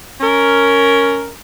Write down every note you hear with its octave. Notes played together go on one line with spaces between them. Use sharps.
C#4 A#4